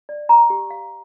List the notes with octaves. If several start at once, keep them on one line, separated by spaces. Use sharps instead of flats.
D5
A#5
G4
F5